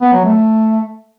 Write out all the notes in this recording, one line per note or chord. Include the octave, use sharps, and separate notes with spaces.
B3
F#3
A3